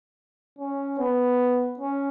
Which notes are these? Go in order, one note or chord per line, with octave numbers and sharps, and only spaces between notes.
C#4
B3
C#4